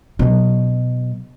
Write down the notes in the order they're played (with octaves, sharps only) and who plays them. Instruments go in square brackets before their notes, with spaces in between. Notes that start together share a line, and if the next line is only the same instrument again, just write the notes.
[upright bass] B2 F#3